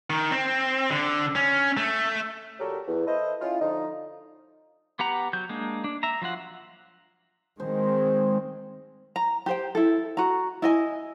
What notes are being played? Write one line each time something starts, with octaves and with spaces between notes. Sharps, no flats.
D#3
C4
D3
C#4
A3
A#2 F#3 G4 A4 A#4 C#5
E2
E4 A4 B4 C5 D#5
C#4 E4 F4
D3 F3 D#4
B3 G4 F#5 A#5
F#3 G6
G#3 A#3 D4
D4
E5 A#5
F3 F#3 F4 F#5
D#3 G#3 C4 C5
A#5
G4 C5 G5
E4 A4
F#4 A#5
E4 D#5 G#5